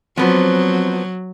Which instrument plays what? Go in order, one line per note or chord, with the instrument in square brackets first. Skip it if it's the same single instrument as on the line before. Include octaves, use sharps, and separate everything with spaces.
[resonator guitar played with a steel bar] F3 B3 [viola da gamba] F#3 [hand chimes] C4 C5